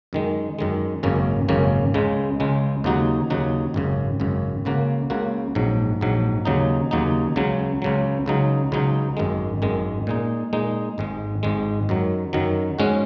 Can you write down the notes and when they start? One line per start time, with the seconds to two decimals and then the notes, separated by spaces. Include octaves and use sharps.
0.13 F#2 D#3 G#3
0.59 F#2 D#3 G#3
1.03 G#1 F#2 C#3 A#3 C#4
1.49 G#1 F#2 C#3 A#3 C#4
1.94 C#2 C#3 G#3
2.40 C#2 C#3 G#3
2.84 D#2 C#3 F#3 D#4 F#4
3.30 D#2 C#3 F#3 D#4 F#4
3.74 G#1 F#2 C#3
4.20 G#1 F#2 C#3
4.65 C#2 C#3 A#3 F#4
5.10 C#2 C#3 A#3 F#4
5.55 A#1 G#2 F#3
6.01 A#1 G#2 F#3
6.45 D#2 C#3 F#3 D#4
6.91 D#2 C#3 F#3 D#4
7.36 C#2 C#3 F#3
7.82 C#2 C#3 F#3
8.26 C#2 C#3 F#3 D#4
8.72 C#2 C#3 F#3 D#4
9.17 G#1 F#2 D#3 G#3
9.62 G#1 F#2 D#3 G#3
10.07 A#2 G#3 D#4
10.53 A#2 G#3 D#4
10.98 G#1 G#2 G#3
11.43 G#1 G#2 G#3
11.89 F#2 D#3 F#3
12.33 F#2 D#3 F#3
12.79 G#2 G#3 C#4 F#4